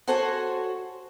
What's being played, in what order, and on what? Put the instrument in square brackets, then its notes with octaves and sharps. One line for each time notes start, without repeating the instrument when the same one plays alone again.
[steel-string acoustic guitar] F#4 A4 C5 C#5 F#5 G#5